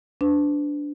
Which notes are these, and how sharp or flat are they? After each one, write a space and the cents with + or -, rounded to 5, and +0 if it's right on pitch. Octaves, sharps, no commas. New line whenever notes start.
D4 -10 B4 +40